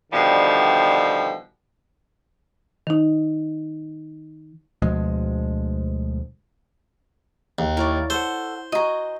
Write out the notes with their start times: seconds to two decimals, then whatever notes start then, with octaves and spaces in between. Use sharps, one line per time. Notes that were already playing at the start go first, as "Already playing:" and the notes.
0.11 B2 D3 D#3 F3 G3
2.87 D#3 D#4
4.82 D2 B2 F3 G#3
7.59 D#2
7.77 E4 A#4 C#5 D5
8.10 A4 C5 F#5
8.72 F#4 D#5 G#5 A#5